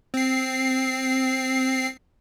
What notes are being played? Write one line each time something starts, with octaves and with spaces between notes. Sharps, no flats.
C4 C7